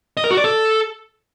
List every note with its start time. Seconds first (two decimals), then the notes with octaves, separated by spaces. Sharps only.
0.17 D#5
0.24 A#4
0.31 F#4
0.37 D5
0.44 A4